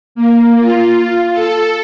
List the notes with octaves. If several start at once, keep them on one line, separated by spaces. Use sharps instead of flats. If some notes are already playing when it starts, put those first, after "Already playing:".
A#3
F4
A4